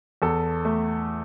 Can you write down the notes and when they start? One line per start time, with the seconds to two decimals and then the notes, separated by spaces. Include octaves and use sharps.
0.22 E2 A4
0.65 A3